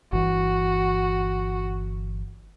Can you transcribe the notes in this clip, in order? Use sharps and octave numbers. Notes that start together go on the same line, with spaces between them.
G1 E3 F#4